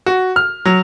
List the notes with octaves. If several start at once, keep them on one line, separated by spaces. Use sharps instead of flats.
F#4
F6
F#3